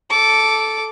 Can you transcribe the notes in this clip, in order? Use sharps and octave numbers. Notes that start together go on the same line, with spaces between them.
A4 D6